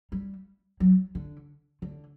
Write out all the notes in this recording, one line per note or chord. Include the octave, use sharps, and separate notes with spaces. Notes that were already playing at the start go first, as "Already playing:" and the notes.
G3
F#3
D3
D3